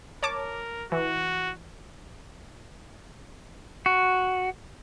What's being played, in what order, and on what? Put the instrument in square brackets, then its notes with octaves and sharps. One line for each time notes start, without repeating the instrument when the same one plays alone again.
[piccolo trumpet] A#4 [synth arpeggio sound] C#5 A5 D6
[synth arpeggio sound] E3 [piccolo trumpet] F#4
[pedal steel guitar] F#4